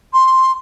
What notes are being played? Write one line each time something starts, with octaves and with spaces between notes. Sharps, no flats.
C6